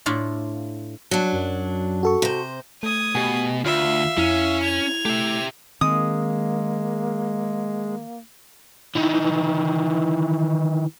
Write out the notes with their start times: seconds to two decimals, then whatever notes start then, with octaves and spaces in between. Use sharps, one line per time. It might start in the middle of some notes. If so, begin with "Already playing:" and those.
0.06 A2 D4 E4 F4
1.11 F#3 D4
1.32 F#2
2.03 F#4 A4 C#6
2.22 C3 C5
2.83 A3 D#6 G#6
3.15 B2 G4 G#5
3.65 D2 F4 E5 F5 F6
4.18 F2 C#4 E4
4.63 G#6 F7
5.05 A3 G4 E5
5.81 D#3 G#3 A#3 C4 D#6
8.95 D#3 E3